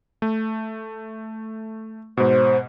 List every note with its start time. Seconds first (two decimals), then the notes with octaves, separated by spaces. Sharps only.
0.22 A3
2.17 G#2 B2 C5